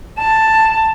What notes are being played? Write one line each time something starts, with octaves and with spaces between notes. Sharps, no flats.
A5